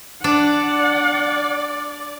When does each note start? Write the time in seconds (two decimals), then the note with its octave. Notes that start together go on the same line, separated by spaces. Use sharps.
0.24 D4 D5 F#5